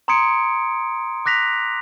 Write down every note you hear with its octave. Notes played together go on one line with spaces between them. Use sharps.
A#5 C6 D#6 G#6 C#7 D7
D6 F#6 A#6 B6 F7